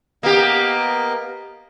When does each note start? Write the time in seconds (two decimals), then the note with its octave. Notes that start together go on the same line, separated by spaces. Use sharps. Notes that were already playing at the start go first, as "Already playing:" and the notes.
0.23 A#3 B3 G4 A#4 D#5